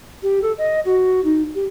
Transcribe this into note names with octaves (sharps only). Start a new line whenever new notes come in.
G4
A4
D#5
F#4
D#4
G4